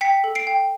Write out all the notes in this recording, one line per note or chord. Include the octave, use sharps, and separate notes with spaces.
G5 B6 C#7
A4
C7 D7
G5